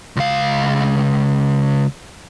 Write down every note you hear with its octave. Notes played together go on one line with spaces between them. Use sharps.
C#2 F5